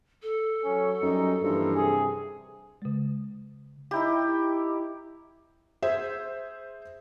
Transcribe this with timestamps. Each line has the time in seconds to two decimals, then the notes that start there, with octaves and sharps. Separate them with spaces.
0.22 A4
0.63 F#3 C#4
1.03 F#2 G3 C#4 D#4
1.42 G2 E3 F3 A#3
1.75 C3 G#4
2.82 C#3 G#3
3.91 D#4 E4 G4
5.82 G#4 C5 E5